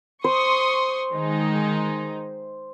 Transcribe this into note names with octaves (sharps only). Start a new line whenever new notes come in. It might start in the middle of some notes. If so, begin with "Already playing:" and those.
C5 C6 C#6 D#6
D#3 G#3 D#4